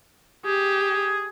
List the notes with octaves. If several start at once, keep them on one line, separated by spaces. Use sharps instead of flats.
G4 G#4